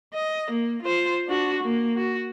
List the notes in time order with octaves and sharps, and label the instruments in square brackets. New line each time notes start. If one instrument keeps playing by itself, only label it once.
[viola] D#5
A#3
F4 C5
D4 F#4
A#3
F#4